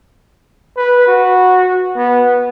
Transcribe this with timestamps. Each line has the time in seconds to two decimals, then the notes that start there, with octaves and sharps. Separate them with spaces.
0.77 B4
1.07 F#4
1.96 B3